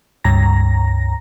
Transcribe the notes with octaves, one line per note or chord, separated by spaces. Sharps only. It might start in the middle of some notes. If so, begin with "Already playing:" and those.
C#2 G2 A#5 A#6